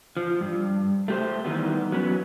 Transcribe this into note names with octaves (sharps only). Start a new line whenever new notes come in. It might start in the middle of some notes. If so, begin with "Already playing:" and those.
F3
G2
A3 G4 C5
D#3 E3 G3 B3
F#3 B3 C#4